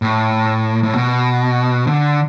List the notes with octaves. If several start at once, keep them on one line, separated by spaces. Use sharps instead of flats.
A2
A2
B2
D3